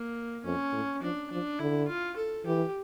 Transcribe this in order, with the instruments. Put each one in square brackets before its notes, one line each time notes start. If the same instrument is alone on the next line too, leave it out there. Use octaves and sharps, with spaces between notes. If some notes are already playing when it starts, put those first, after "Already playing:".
Already playing: [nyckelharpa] A#3
[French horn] F2 [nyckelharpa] C#4
[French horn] A2
[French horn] F3 [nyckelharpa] D4
[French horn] F3 [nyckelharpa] D4
[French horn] D3 [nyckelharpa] E4
[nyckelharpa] F4
A4
[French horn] E3 [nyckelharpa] G4